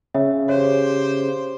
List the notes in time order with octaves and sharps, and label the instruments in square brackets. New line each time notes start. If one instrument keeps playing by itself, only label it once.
[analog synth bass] C#3 [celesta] E5
[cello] G4 C5 [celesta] C#5